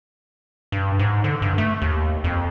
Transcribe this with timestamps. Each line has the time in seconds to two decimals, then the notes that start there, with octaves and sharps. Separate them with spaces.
0.72 G2
0.99 G#2
1.24 D3
1.42 G2
1.58 A3
1.82 D#2
2.24 F2